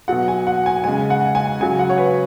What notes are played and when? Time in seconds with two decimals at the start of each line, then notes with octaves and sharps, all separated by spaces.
0.08 B2 F#3 F#5
0.28 G#5
0.47 F#5
0.66 G#5
0.84 C#3 G#3 G#5
1.10 F#5
1.35 G#5
1.60 C#3 F#3 G#5
1.79 F#5
1.90 C#5
1.98 B4